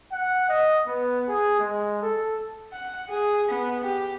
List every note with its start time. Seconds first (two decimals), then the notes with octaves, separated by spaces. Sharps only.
0.12 F#5
0.49 D#5
0.86 B3
1.28 G#4
1.60 G#3
2.02 A4
2.73 F#5
3.09 G#4
3.49 B3
3.84 G4